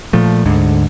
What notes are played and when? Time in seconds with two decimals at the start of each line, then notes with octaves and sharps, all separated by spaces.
0.13 A#2 F3 A3
0.45 D2 G#2 D3